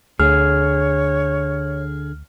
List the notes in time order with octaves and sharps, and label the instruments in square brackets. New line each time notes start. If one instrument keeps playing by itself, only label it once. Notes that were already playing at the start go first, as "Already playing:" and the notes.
[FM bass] D2 [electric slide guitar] D3 G#4 [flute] C#5 [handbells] F6